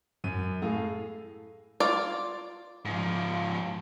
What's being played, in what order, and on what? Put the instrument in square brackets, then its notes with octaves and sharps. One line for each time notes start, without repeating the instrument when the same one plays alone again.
[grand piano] F#2 D#7
A2 G#4 A4 F5
[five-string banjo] F4 D5
[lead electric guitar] G#2 F3